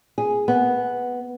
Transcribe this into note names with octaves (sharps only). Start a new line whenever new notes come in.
G#4
B3